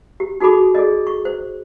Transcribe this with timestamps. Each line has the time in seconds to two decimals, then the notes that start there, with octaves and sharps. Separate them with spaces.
0.20 G4
0.40 D#4 F#4 G#4 A4 B5 D6
0.75 G#4 A4 D5 D#5
1.07 C#6
1.25 C5